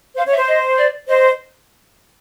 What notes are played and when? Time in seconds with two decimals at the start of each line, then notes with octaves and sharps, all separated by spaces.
0.17 C5 F5
0.27 C#5
0.32 E5
0.37 C5
0.47 D#5
0.77 D5
1.08 C5 D#5